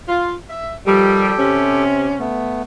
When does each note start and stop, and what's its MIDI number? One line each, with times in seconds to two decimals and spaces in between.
0.09 0.34 65
0.50 0.74 76
0.87 1.32 51
0.87 1.32 53
0.87 1.32 55
0.87 1.84 67
0.87 1.84 69
0.87 1.84 79
1.38 2.26 48
1.38 2.26 61
2.20 2.62 57
2.20 2.62 59